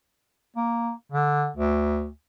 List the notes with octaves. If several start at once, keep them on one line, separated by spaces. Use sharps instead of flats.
A#3
D3
D2